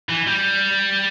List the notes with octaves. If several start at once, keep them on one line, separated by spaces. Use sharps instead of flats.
E3
G3